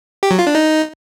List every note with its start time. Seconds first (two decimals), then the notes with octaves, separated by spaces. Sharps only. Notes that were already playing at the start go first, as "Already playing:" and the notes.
0.23 G4
0.31 F#3
0.39 F4
0.47 D4
0.55 D#4